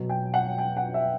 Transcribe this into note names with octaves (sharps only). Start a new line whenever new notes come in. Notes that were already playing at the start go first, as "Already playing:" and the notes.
Already playing: B2 F#3
G5
F#5
G5
F#5
E5